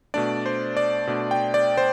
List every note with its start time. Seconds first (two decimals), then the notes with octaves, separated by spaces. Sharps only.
0.14 B2 A3 D4 D5
0.46 C5
0.77 D5
1.07 B2 A3 D4
1.31 G5
1.54 D5
1.77 C5